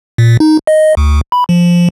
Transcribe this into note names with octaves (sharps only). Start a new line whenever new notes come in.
A#2
D#4
D#5
D2
B5
F3